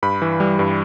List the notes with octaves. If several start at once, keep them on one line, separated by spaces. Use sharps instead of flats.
G2 B5
E3
G3
G2